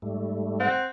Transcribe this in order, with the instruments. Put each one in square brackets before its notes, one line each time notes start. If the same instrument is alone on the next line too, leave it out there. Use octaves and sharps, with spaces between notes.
[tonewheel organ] G#2 G3 A3
[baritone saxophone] C4 [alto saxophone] F#5